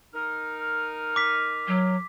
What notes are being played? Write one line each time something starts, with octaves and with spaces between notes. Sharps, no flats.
D#4 A#4 F6
D6 B6
F#3